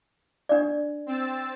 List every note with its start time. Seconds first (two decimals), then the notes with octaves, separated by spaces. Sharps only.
0.49 D4 D5
1.06 C4 E6 A6